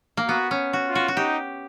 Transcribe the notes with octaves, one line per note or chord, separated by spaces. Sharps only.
A#3
B3 F#4
C#4
F#4
F4
F#4
F#4
D#4 G4